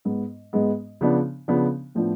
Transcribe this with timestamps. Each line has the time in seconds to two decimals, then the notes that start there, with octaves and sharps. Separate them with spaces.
0.05 G#2 G#3 B3
0.53 G#2 G#3 B3
1.01 C#3 F3 B3 D4
1.48 C#3 F3 B3 D4
1.95 A2 F3 B3 D4